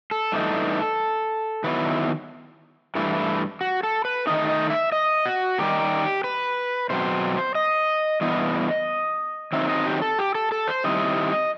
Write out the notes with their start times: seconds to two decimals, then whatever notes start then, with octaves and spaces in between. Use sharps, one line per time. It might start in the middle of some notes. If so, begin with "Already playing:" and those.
0.11 A4
0.32 G2 E3 A3 D#4
1.64 D#3 F#3 B3 E4 B4
2.95 G2 E3 A3 E4
3.61 F#4
3.83 A4
4.05 B4
4.27 D#3 A3 D#4 D#5
4.50 D#5
4.70 E5
4.92 D#5
5.25 F#4
5.59 D#3 G3 D#4 G4
6.24 B4
6.90 B2 F#3 C4 C5
7.55 D#5
8.21 G2 E3 B3 E4 D#5
9.53 D#3 F#3 C4 D#4 E5
9.69 D#5
9.86 G4
10.02 A4
10.19 G4
10.35 A4
10.52 A4
10.68 C5
10.84 D#3 G3 C4 E4 D#5